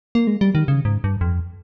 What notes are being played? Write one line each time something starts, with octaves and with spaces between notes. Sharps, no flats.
A#3
G#3
G3
D#3
C#3
G#2
G2
F2